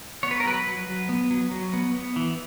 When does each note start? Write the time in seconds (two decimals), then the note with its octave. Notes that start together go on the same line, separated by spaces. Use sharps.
0.23 B3 C#5
0.31 B4
0.40 A#4
0.45 F#3 B4
0.67 F#3
0.87 F#3
1.09 B3
1.31 F#3
1.51 F#3
1.73 B3
1.95 B3
2.16 E3